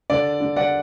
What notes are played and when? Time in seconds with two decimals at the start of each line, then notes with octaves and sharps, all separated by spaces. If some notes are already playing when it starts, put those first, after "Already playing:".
0.10 D3 D5
0.41 D3
0.56 D5 F#5